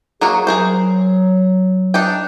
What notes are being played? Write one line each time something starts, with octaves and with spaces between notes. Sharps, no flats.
F#3 A#3 F#4 G#4
F#3 G#4 A#4 C5
D4 D#4 G5